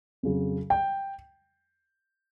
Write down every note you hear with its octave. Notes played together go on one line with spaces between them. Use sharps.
F2 C#3 F#3
G5